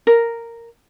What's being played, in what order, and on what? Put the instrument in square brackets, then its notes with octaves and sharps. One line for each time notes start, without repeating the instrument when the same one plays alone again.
[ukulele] A#4